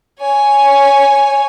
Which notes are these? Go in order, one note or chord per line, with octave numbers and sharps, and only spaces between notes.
C#5 G#5